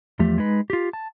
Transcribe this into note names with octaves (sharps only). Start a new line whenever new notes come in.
E2 F3 A3 G4
G#3 D#4 B4
F4 G4
A5